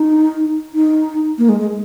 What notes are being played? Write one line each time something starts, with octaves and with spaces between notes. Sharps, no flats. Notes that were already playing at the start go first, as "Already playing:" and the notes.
Already playing: D#4
D#4
A#3
G#3
G#3